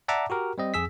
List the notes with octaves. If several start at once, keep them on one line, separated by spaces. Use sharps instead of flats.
D5 E5 F#5 A5 A#5 D6
F#4 G4 A#4
G3 C4 D#5
F2 G#4 E6 B6